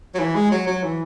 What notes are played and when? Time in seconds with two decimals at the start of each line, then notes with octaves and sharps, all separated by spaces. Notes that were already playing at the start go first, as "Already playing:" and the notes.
0.14 F#3
0.19 E3
0.35 G#3
0.51 F#3
0.67 F#3
0.83 E3